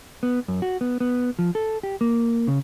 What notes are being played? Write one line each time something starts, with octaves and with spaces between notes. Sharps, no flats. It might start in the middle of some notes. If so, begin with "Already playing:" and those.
B3
F#2
F#4
B3
B3
F3
A4
G4
A#3
C#3